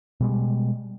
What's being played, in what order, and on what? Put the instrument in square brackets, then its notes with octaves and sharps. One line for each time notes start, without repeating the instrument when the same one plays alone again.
[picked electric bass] B2 G3 G#3